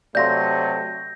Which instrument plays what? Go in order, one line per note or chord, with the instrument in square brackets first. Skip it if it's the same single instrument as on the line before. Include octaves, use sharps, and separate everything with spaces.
[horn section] C3 F#3 A3 [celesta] D5 F5 C6 [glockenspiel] G6 A#6